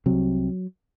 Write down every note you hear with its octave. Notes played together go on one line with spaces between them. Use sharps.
C2 C3 F#3